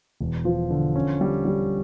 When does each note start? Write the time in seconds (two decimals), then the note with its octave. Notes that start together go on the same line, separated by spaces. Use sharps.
0.21 E1
0.45 F3
0.70 D3
0.96 C#4
1.21 G3
1.45 G3